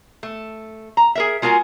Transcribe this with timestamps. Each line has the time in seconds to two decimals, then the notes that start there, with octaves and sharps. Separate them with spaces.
0.23 A3
0.97 A#5
1.15 G#4 A#4 E5
1.42 G#3 F4 F#4 A#4 G#5